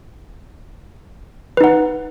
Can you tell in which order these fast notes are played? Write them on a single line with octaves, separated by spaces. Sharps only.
B4 D#4 F#5